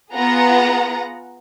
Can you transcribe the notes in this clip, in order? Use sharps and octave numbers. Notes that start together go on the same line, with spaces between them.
B3 F4 G#4 F#5 A#5